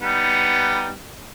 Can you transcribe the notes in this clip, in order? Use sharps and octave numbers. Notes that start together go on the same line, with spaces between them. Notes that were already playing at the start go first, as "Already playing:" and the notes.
G3 B3 D#4